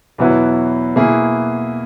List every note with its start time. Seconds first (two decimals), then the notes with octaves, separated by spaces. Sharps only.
0.18 E2 B2 F#3 B3 E4
0.96 B2 A#3 E4 G#4